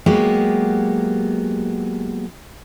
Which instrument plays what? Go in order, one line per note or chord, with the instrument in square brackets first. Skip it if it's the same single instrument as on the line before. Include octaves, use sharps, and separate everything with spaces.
[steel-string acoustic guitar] F#3 G#3 A#3 B3 G4